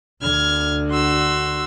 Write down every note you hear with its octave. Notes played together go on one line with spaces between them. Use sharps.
D2 D3 F6 G#6
F#4 C6 E6